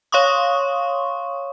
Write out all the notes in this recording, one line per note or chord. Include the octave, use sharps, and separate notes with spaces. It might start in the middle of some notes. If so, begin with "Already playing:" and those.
C#5 F5 C6 C#6 D#6